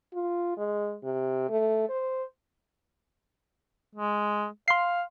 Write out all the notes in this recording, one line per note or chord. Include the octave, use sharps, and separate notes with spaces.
F4
G#3
C3
A3
C5
G#3
F5 C6 C7